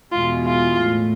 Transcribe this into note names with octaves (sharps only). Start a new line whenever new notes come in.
E2 B2 G#3 F4
F4
A2